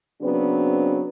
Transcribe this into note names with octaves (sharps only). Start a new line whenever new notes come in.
C#3 F#3 B3 C4 D4